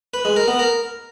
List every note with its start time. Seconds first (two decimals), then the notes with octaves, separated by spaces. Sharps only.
0.14 B4
0.25 G#3
0.36 A#4
0.48 B3
0.59 A#4